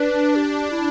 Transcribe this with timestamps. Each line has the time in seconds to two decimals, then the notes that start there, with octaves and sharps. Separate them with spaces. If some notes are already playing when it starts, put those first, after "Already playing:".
Already playing: D4 B4
0.36 G4
0.71 E4